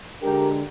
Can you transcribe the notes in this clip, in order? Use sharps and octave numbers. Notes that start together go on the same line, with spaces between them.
D3 G#3 D4 G4 A#4